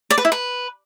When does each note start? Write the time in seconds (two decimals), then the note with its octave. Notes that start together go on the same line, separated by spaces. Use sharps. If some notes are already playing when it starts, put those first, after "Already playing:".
0.11 D5
0.18 B4
0.25 E4
0.32 B4